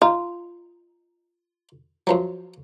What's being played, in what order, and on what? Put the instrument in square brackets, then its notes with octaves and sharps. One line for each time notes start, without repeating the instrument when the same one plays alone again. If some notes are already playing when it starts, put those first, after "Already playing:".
[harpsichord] D#4 [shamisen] F4
[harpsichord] F#2 F3 F#3